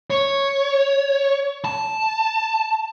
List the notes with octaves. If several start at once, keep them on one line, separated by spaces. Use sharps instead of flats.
C#5
A5